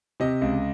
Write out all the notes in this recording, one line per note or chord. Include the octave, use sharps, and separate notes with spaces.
C3 D#5
C#2